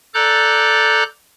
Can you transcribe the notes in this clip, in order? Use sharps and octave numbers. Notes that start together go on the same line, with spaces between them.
A4 D5 A#5 D6 F#6 G6